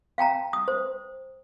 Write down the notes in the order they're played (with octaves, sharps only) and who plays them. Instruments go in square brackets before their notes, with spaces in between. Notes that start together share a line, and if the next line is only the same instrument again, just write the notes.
[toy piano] F5 G5 A5 A#5
D#6
C5